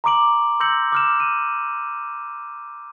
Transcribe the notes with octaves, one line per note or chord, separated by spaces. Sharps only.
A#5 C6 D6 D7 F#7
C6 E6 G6 A#6 C#7 F#7
D6 F6 E7
D#7